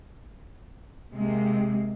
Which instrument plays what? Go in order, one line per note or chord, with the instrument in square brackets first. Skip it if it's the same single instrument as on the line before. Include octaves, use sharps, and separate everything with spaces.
[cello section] C3 G#3 A#3